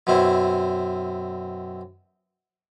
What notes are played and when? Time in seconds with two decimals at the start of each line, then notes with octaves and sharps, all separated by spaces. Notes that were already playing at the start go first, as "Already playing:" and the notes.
0.07 F#2 B2 C4 E4